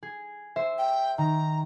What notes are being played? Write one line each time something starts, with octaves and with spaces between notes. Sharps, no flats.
G#4
C5 E5
G5
D#3 A#5